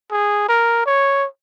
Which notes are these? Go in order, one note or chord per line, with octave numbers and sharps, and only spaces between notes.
G#4
A#4
C#5